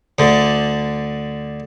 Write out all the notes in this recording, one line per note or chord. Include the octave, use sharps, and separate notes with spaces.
D2 D3